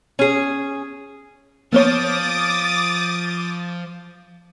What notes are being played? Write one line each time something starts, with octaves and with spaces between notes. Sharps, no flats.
C#4 G#4
F3 A#3 B3 C#5 D6 D#6 A6